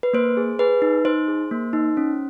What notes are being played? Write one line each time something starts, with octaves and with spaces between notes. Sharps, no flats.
B4
A#3 C5
G#4
G#4 B4
D#4
D#4 C5
G#4
A#3
D#4
C#4